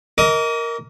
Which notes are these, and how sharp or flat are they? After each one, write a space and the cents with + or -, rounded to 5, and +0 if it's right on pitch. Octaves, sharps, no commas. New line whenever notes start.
A#4 +0 D#5 +25 D6 -40